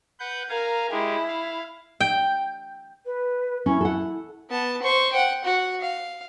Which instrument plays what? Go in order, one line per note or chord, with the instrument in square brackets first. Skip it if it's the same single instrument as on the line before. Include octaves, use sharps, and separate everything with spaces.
[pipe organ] B4 F#5 G6
[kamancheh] A#4 [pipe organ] F5 G#5 A#5
[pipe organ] G#3 G4 [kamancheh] E4
[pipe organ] F5
[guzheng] G5
[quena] B4
[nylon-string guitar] C#4 [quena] E4
[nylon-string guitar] A4 F#5
[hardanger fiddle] B3 A5
C5 C#6
F#5 G5
F#4 F#5
F5